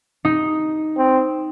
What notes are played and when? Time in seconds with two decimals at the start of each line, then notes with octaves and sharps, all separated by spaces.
0.25 D#4
0.97 C4